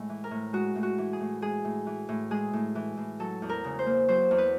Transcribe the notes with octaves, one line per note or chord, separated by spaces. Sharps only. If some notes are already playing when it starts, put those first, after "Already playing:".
Already playing: A2 G#3
E3
A#4
A2
G#3 F#4
A2
F#4
E3
G#4
A2
G#3 G#4
A2
E3
A2
G#3 G#4
A2
E3
A2
F#3 A4
E2
A#4
C#3
C5
A#3
F#3 C5
E2
B4